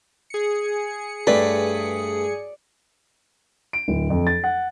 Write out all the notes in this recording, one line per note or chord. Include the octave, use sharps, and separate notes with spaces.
G#4 C#7
G2 A3 B4 D5
D7
D1
F2
A6
F#5